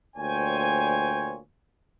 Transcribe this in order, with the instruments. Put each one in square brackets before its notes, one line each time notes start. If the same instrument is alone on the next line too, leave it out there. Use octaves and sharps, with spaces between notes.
[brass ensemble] D2 A#2 C5 C#5 G5 G#5